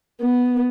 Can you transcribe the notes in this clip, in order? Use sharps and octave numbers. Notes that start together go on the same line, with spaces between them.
B3